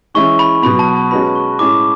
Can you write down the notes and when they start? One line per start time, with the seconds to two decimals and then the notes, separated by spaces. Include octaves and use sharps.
0.14 E3 G#3 C#4 E4 C#6
0.39 B5
0.63 B2 F#3 B3 B5
0.79 A5
0.96 A5
1.11 G#3 C#4 F#4 B4 B5
1.35 C#6
1.59 A2 G#3 C#4 D6